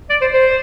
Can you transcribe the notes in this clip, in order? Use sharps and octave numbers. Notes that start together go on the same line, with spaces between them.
D5
C5
C5